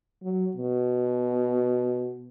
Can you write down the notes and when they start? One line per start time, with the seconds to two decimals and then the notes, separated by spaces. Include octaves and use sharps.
0.23 F#3
0.57 B2